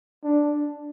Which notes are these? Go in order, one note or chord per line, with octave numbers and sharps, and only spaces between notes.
D4